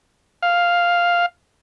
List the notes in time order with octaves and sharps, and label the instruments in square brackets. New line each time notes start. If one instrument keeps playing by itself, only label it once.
[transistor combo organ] F5